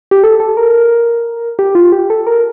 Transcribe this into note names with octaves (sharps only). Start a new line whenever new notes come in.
G4
A4
A4
A#4
G4
F4
G4
A4
A#4